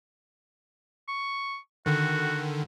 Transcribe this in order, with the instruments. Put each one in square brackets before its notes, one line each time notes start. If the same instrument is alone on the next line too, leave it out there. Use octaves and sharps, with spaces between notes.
[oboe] C#6
[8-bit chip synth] D3 D#3 [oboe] F#4